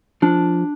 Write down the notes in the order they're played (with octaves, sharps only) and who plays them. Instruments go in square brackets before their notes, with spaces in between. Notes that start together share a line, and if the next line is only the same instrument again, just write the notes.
[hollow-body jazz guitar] F3 [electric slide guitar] D4